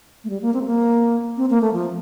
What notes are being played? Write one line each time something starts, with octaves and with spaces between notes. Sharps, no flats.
A3
G3
A#3
C4
A3
A#3
C4
A#3
A3
F3